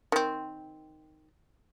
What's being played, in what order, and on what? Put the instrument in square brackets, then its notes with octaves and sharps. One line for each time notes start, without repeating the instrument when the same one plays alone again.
[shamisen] D#3 C4